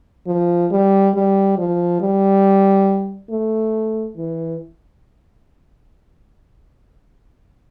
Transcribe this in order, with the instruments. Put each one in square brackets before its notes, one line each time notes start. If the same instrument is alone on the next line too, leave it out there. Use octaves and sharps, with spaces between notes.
[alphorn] F3
G3
G3
F3
G3
A3
E3